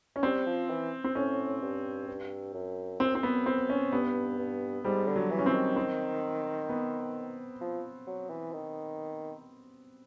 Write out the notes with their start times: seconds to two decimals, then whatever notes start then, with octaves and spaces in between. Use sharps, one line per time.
0.16 C#4
0.23 G3 C4
0.47 F3
0.70 E3
1.04 C4
1.15 A2 C#4
1.62 G2
2.08 G2
2.54 F#2
3.00 F#2 C4
3.15 C4
3.23 B3
3.46 C4
3.70 C#4
3.92 G2 B3
4.38 G2
4.84 G#2 G3
5.07 D3
5.16 F#3
5.31 E3
5.39 C#4
5.46 C4
5.54 D#3
5.76 C4
6.69 B3
7.61 F3
8.07 F#3
8.30 E3
8.53 D#3